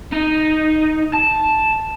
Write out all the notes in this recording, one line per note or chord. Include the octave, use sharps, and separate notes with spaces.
D#4
A5